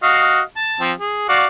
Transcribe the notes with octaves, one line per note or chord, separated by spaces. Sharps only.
F#4 D#5 F5
A5
F3 C4
G#4
F#4 D5 F5